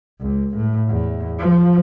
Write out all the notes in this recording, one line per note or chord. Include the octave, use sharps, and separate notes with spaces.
C#2
A2
E2
F3